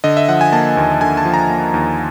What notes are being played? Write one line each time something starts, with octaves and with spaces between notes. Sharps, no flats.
D3 D#5
E5
F3 F#5
G#5
A#3 A5
D#2
D3 G#5
A5
F3
A#5
A#3
D#2